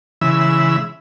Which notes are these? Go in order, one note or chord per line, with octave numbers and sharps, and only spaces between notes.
C#3 E3 G#3 E5 B5 E6